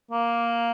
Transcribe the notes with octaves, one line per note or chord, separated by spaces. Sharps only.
A#3